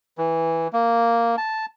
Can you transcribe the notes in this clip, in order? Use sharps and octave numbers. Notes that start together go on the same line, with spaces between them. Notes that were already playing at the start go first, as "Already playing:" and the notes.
E3
A#3
A5